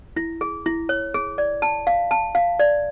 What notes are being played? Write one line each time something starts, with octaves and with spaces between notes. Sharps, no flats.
E4
G#4
E4
C#5
G#4
D5
A5
F5
A5
F5
D5